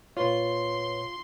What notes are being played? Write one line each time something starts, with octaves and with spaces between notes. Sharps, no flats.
A#2 F4 B4 C#5 C6